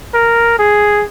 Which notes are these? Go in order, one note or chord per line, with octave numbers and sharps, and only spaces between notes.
A#4
G#4